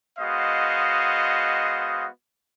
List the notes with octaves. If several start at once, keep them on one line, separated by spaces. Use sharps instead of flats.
G#3 B3 F#4 C5 D#5 F5